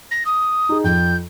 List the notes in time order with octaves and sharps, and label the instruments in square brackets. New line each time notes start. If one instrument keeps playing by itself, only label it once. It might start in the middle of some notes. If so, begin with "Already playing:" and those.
[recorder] A#6
D#6
[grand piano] D#4 G#4
[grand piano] F2 [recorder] G6